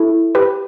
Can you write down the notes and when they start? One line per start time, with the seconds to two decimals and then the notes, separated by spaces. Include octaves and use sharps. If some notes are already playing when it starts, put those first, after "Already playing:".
Already playing: E4 A4
0.35 G4 B4